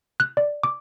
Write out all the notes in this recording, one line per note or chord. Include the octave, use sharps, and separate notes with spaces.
F#6
D5
D6